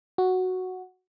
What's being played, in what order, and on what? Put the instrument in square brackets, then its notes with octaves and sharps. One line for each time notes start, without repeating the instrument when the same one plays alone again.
[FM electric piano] F#4